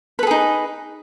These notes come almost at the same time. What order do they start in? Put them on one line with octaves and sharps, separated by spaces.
B4 A4 G#4 D#4